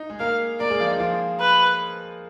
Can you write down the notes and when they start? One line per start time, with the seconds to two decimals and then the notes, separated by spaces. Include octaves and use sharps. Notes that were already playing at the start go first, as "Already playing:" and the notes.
Already playing: D#4
0.10 G#3 G#4
0.19 A#3 A#4 F5
0.60 A#3 A#4 D5
0.70 G#3 G#4
0.80 F3 F4
0.91 D#4
1.00 F3 F4
1.40 B4